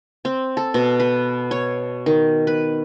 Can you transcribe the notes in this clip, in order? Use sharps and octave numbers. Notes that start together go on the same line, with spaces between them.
C4
A4
B2
B4
C#5
D#3
B4